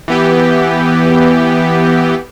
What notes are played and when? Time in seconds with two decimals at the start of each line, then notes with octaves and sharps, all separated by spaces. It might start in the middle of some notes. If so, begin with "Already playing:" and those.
0.08 E3 B3 G4